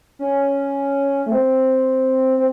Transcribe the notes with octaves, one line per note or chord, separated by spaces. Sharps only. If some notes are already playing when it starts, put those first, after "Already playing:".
C#4
A3
C4
C4